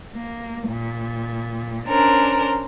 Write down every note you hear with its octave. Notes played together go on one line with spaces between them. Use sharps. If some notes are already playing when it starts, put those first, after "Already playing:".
A#3
A#2
C#4 D4 A#4 C5